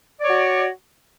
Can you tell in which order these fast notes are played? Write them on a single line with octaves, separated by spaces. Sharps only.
D5 C#5 F#4